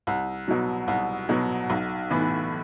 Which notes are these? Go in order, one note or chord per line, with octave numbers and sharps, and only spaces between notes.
C2
B2 F#3
C2
B2 F#3
B1
A2 E3 B3